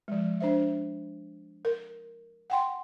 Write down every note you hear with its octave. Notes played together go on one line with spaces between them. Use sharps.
F3 G#3
D4 C5 E5
A#4
F#5 G5 C6